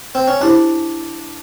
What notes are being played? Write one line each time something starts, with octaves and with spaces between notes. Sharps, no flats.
C4
C#4
C#4 D4 E4 G4 C5